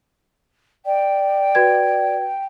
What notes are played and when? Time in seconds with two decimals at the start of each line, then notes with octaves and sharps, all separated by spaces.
0.85 D5 G5
1.55 F#4 B4 G#6